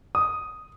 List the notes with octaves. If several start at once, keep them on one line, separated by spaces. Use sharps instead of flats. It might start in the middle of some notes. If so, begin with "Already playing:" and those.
D#6